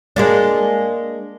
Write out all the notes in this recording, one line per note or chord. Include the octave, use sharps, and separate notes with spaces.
G#3 A#3 D4